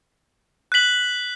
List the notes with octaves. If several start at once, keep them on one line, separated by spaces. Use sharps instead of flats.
F#6 B6 F#7